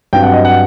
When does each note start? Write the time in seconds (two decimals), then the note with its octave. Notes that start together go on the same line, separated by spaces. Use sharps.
0.13 G2 F#3 C4 G5
0.23 F#5
0.34 D#5
0.45 F#5